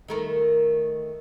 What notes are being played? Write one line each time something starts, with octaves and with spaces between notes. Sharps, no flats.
D#3 A3 A#4